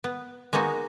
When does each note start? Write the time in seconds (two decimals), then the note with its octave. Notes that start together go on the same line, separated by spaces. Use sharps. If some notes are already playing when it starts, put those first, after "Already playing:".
0.04 B3
0.53 G#3 A#3 B3 D#4 F#4